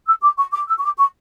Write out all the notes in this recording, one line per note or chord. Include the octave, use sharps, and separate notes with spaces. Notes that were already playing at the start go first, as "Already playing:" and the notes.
E6
D6
C#6
D6
E6
C#6
D6
C#6